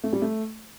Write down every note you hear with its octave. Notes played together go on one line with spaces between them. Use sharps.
A3
G3
A3